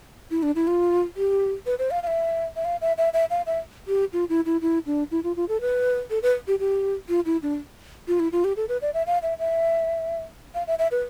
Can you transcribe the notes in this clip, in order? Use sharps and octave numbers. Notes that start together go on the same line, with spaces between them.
E4
D4
E4
F4
G4
B4
C5
F5
F5
E5
E5
F5
E5
E5
E5
F5
E5
G4
F4
E4
E4
E4
D4
E4
F4
F4
A4
B4
A4
B4
G4
G4
F4
E4
D4
F4
E4
F4
G4
A4
B4
D5
E5
F5
E5
E5
F5
E5
E5
B4